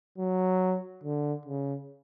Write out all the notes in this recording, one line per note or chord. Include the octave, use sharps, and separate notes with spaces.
F#3
D3
C#3